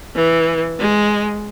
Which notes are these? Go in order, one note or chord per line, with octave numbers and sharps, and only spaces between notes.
E3
G#3